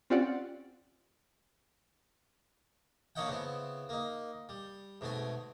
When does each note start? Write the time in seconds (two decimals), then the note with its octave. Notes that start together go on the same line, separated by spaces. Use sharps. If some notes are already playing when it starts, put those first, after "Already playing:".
0.10 C4 C#4 F4 G4 D5 F#5
3.16 A#3 D4 C#5 D#5 F#5 G5
3.29 C#3 B3 C4 E4
3.89 A#3 D#4
4.49 G3
5.01 G#2 B2 A3 C4 G#5